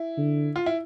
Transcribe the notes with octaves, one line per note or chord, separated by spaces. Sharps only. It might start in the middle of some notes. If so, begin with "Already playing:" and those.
Already playing: E4
D3
F4
E4